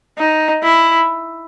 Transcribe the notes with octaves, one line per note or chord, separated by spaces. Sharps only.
D#4
E4